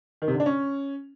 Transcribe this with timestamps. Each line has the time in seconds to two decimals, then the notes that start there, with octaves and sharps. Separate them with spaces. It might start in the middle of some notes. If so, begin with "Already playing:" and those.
0.22 D#3
0.28 C3
0.34 D3
0.40 D4
0.46 C#4